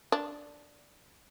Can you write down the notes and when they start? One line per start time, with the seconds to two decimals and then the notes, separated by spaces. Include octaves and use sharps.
0.12 D4